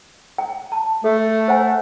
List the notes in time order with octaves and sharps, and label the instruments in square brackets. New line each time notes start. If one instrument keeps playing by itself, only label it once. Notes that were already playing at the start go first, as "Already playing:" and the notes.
[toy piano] G5
A5
[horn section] A3 [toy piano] A4
[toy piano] C5 F#5 G#5